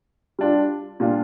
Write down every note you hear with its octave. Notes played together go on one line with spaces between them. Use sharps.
G3 D4 F4
A#2 G3 D4 F4